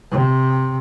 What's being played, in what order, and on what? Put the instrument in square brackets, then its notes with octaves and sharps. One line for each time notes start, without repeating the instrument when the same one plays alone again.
[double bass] C3